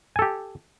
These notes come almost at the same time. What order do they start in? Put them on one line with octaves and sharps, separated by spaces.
G#5 A4 G4